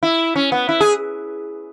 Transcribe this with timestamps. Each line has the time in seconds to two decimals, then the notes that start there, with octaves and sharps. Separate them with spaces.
0.03 E4
0.36 C#4
0.52 B3
0.69 E4
0.80 G#4